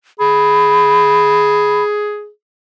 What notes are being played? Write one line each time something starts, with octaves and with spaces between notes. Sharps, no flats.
G#4 B5